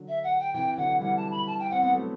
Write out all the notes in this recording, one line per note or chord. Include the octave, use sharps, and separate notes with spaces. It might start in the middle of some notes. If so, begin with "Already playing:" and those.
Already playing: D3 F#3
E5
F#5
G5
C3 E3 G5
D3 F#3 F#5
E3 G3 F#5
A5
B5
A5
G5
C4 F#5
B3 F#5
F#3 A3